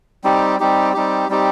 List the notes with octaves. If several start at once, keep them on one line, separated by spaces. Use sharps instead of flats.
G3 C4 D#4 G4
G3 C4 D#4 G4
G3 C4 D#4 G4
G3 C4 D#4 G4